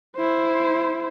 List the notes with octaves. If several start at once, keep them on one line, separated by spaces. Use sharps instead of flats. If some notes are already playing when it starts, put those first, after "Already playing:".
E4 C5